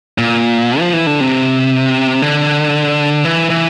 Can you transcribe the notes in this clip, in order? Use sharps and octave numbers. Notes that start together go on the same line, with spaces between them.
A#2
F3
E3
D3
C3
D3
E3
E3